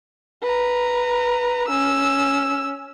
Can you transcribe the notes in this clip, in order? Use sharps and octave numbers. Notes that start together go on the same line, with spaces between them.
B4 A#5
C#4 E6